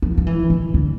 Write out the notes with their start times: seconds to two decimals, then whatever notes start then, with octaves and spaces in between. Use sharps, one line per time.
0.02 F3
0.17 F3
0.27 E3
0.50 D#3
0.74 D3